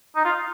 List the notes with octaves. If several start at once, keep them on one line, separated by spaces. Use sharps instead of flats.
D#4
F4